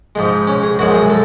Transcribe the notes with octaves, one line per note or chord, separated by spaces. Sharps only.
G#2 F3 G#3
C#4
G#4
F#2 F3 G#3 F#4
G#4
A4